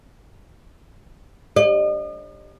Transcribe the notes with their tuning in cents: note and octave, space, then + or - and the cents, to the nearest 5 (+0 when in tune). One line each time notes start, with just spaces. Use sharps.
D#5 -40